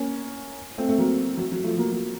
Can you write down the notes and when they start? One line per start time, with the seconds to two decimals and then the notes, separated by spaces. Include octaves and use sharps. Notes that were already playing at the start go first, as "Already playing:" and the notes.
Already playing: A#3 C#4
0.78 A3 C4
0.89 A3
0.98 F#3 A#3
1.38 F#3
1.52 F#3
1.64 F3 A3
1.77 F#3 A#3
1.92 F#3